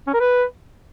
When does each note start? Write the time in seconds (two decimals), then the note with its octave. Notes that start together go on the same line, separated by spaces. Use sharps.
0.07 C#4
0.14 A#4
0.20 B4